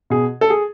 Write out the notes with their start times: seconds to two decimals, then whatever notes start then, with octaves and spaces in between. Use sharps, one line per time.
0.10 B2 G#4
0.41 A4
0.50 G#4